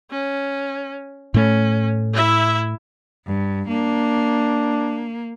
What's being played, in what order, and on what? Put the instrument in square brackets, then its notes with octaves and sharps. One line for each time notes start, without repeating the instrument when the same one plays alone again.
[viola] C#4
[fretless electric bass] A2 A3 [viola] C#4
[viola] E4 E5
[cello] G2
[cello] A#3 [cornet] D4